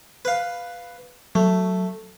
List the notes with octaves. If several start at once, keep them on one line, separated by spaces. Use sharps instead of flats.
B4 F5
F#3 A3